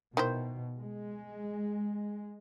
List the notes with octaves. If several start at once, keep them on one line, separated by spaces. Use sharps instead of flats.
B2 D#3 E4 C5
G#3